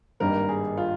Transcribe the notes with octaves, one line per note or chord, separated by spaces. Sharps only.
G#1 G2 D#3 G3 A#3 A#4
G#4
F4